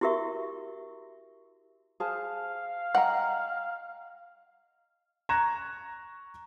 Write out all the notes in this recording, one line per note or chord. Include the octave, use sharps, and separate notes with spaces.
E4 F#4 G4 A#4 E5 C#6
G#4 C5 F5 A5
D#5 F#5 G5 A#5
A#5 C#6 F#6 G#6 A#6 E7